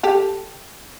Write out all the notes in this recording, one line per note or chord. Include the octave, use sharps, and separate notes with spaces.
G4 A4